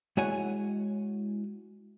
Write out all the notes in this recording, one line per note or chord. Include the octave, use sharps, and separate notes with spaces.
G#3 E4 F#4 C#5 F#5 G#5